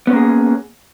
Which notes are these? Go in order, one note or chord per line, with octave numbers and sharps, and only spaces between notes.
A#3 B3 C#4 G#4